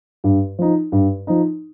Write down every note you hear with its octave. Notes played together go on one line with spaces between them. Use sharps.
G2
F3 D#4
G2
F3 D#4